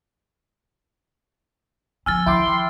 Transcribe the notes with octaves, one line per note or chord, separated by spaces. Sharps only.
F3 B3 G#5 E6 F6 A6
D#3 F3 E4 G5 C6 D6